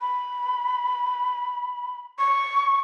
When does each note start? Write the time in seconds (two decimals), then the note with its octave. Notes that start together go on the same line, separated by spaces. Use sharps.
0.01 B5
2.19 C#6